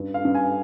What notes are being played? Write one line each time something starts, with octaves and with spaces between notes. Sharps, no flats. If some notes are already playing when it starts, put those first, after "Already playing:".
Already playing: G2
F5
G2
G#5